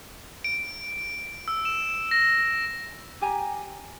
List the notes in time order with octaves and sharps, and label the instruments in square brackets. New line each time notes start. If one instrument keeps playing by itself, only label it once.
[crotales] D7
E6
E7
A#6
[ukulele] G4 G#5 A#5